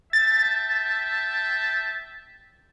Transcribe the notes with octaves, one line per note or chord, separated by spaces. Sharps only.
E5 G5 A5 A6